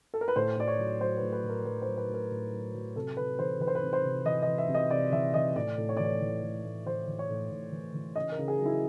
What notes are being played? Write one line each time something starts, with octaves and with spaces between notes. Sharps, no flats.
A4
A#4
B4
A2 C5
A2 D5
C#5
F#3
F#3 C5
A2 B4
B4
A2
A#4
F#3 B4
C5
F#3
B4
A2
A#4
A2
F#3
F#3
C3 A4
C3 B4
E3 C5
E3 B4
C5
B4
C3
C5
C3
E3 D#5
E3 D#5
E5
C3
D#5
C3 D5
E3 E5
E3 D#5
A2 D5
A2
C#5
E3 D5
C#5
E3
A2
A2
E3 C5
E3
C#5
A2
A2
E3
E3
C#3 D#5
A#4
C#3
G#4
F#3
E4